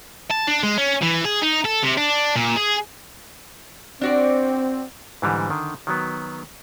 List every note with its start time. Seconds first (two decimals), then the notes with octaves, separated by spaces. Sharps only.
0.31 A5
0.47 D4
0.63 G#3
0.78 C#4
1.02 E3
1.25 G#4
1.43 D#4
1.65 A4
1.83 C3
1.98 D4
2.36 A#2
2.56 G#4
4.01 C4 D4 F#4 D5
5.22 G#2 D3 E3 G3
5.50 D3 D#3
5.87 D#3 F#3 B3